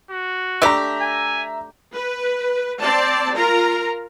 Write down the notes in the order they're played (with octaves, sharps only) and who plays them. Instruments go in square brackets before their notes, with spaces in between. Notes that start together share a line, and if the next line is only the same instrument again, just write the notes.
[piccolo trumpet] F#4
[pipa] A3 D4 G4 [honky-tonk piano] E5 A#5
[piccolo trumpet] G#5
[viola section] B4
C4 D5 A5
F4 A#4 A#5